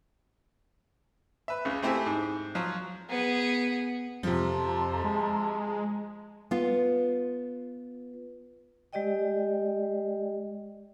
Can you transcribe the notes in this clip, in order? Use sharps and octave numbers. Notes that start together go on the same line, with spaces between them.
B4 E5
C#2 C#3
A3 C4 E4 G4 C5 G#5
G#2
F3 F#3 F4
B3 G#4
F2 C3 F3 A5 A#5 C6
G#3
B3 F4
G#3 G4 D5 D#5 G5